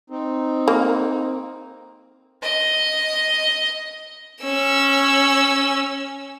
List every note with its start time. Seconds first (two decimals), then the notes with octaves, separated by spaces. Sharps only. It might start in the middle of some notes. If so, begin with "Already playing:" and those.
0.10 C4 D#4
0.68 A#3
2.43 D#5
4.43 C#4 E6